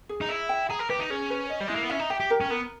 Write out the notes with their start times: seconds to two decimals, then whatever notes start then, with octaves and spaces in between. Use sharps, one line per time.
0.09 G#4
0.21 D#4
0.29 E4 E5
0.49 G5
0.70 G#4 A#5
0.79 A#4
0.89 G4 B4
1.00 D#4
1.10 C#4 G#4
1.30 B4
1.50 D#5
1.60 G3
1.68 G#3 E4
1.76 A#3
1.82 B3
1.90 C#4 E5
1.99 D#4
2.10 G4 G5
2.20 G4
2.30 A#4
2.41 C#4
2.50 B3 A#4